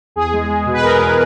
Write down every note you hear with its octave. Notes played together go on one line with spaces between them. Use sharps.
E2 G#4
G#3
G#3
B2
B4
E2 A#4
E2